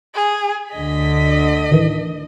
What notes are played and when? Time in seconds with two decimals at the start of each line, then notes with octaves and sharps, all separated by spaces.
0.15 G#4
0.72 D2 D3 D#5 B6
1.71 A1 D#3 E3